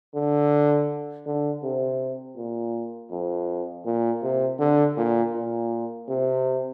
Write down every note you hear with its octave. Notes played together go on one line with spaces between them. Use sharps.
D3
D3
C3
A#2
F2
A#2
C3
D3
A#2
A#2
C3